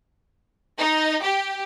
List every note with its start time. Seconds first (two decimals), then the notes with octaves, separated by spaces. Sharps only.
0.78 D#4
1.22 G4